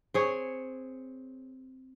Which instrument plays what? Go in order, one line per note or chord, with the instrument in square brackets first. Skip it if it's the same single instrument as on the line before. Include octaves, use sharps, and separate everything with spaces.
[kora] C4 G#4 C#5